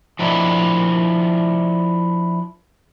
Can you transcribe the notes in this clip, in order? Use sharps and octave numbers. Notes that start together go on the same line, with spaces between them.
F3 D4 E4